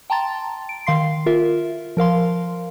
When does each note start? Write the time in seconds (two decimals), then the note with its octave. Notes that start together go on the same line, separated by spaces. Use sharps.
0.10 G5 A5 A#5 C6 A6
0.69 D7
0.87 D#3 F5 C6 C7
1.26 F4 A#4 E5
1.97 F3 A#4 F5 C6